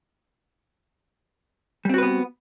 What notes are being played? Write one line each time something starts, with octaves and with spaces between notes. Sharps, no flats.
G3 B3 C4 F#4 B4